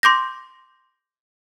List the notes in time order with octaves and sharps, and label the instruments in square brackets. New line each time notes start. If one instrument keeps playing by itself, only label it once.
[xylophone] C6 D6 G6 A#6